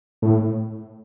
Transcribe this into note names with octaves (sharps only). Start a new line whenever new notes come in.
A2